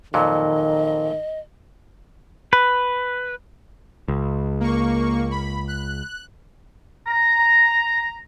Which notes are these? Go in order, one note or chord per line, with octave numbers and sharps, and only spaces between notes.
F2 A#2 D#3 F#3 D#5
B4
C#2
A#3 C#6
B5
F#6
A#5